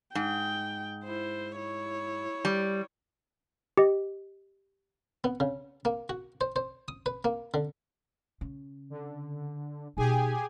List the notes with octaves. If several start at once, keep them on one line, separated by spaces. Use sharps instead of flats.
G#2 G5
E4 C5
E4 C#5
G3
G4 D#5
B3
C#3
A#3
F#4
C5
C5
D#6
B4
A#3
D3
C#3
D3
B2 D#4 G4 G#4 G#5